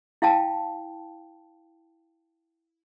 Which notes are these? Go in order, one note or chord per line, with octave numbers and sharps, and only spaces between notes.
E4 F5 G5 A5